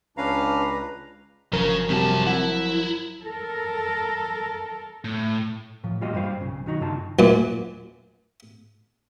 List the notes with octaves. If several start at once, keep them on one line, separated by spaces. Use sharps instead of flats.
C#2 C#4 D4 B4 F5 A#5
G1 C#3 F3 F#3 A#4
F#2 C3 G3 F#4 A5
E4 F#5
A4 A#4
A2
A2 F3
E3 G3 A#3 F4 F#4 D#5
G2 G3 C5 F5
B1 C#3
D#3 F#3 D#4 F#4
G2 C#3 D#4 F4 A5
F#2 A#2